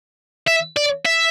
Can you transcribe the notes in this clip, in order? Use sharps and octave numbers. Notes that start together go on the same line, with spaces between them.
E5
D5
E5